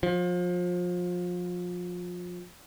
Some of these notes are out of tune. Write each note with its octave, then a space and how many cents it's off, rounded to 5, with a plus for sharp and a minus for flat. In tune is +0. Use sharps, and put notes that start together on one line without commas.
F3 +30